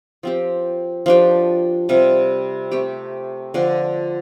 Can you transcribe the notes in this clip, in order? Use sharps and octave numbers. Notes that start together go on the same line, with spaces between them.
F3 C4 G4
F3 D4 G4
C3 G3 F4
A3 C4 G4
D3 F3 D4